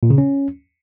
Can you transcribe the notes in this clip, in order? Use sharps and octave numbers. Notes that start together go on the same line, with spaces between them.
A#2
C#3
C#4